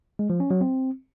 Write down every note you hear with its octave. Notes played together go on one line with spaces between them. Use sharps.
G#3
F3
C#4
F#3
C4